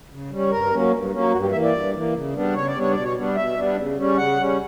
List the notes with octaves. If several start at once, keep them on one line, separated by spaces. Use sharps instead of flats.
C#3
G3 C#4
G2 A#4
F#3 A#3 C#4
G2
F#3 A#3 C#4
G2 F#4
G4
E3 A#3 E5
D5
G2
E3 A#3
C#3
G3 B3 D4
C#3 C#5
D5
G3 B3 D4 C#5
B2 D5
C#5
G3 B3 D4
B2 E5
G3 B3 D4
C#3
G3 C#4
C#3 F#5
G3 C#4